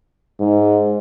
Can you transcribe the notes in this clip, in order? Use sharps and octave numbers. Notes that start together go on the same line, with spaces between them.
G#2